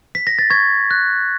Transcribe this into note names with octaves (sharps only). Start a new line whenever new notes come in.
B6
A#6
A6
C#6 G#6
F#6